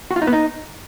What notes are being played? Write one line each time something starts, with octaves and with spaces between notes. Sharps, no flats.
F#4
F4
D#4
B3
D#4